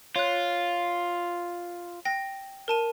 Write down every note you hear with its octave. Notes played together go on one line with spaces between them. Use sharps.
F4 C#5 F#6
G5 A#6
A#4 A5 D#7